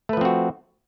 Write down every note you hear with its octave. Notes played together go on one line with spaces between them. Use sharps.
F3 A3 C4 F#4 B4